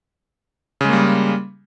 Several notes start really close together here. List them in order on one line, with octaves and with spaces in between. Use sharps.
C#3 G#3 A#3 G3